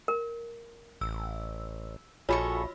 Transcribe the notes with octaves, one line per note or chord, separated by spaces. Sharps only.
A#4
A1 E6
A#1 F4 F#4 G#4 A4 C#5 B5 C#6